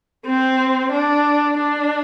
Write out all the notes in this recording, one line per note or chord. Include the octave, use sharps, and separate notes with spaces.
C4
D4
D4